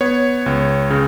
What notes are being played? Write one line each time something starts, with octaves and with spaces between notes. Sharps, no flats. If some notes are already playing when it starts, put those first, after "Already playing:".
B3 C#5
C#2
C#3